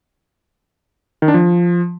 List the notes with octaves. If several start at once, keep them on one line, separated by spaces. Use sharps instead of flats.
D#3
D4
F3